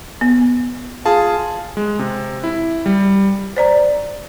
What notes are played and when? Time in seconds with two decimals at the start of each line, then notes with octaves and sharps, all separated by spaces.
0.21 B3
1.06 F4 G#4 A5
1.77 G#3
1.99 C3
2.44 E4
2.86 G3
3.57 C5 D5 A#5